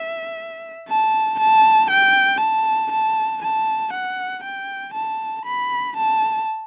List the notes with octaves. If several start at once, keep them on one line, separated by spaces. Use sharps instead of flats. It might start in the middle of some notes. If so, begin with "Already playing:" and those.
Already playing: E5
A5
A5
G5
A5
A5
A5
F#5
G5
A5
B5
A5